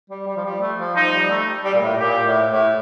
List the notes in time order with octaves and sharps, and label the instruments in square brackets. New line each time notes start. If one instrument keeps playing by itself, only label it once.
[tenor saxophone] G3
G3
F3
G3
A3
F3
[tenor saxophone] F3 [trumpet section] D#4
[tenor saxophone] G3
A3
G3
A#2
A2
[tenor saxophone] A#2 [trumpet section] G4
[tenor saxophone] A2
A2